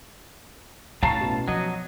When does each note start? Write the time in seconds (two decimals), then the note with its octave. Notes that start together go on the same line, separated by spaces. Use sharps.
1.03 A2 C#4 F5 A5 A#5 C#6 C7
1.21 B2
1.48 F3 F#3 D#5